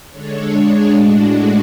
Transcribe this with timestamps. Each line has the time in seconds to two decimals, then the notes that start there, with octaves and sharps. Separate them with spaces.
0.10 D3 G#3 D4 A4 C#5
0.52 G#3 D4 G#4 C#5
0.92 A2 G#3 D4 F#4